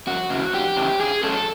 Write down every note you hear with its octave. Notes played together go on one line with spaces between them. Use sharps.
F2 F#4
C#3 E3
F2 G4
C#3 E3
D3 G#4
F#3 A3 C#4 A4